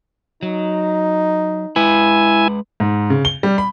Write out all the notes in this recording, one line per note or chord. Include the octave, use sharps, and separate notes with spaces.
F#3 D#4
G#3 E4 B4 G#5
G#2
C#3
G7
G3
B5